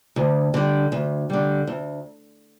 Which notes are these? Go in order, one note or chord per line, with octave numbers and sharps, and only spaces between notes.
D2
D3 G3
D2
D3 G3
D2